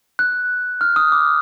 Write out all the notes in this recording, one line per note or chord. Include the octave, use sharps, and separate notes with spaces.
F#6
F6
D#6
D6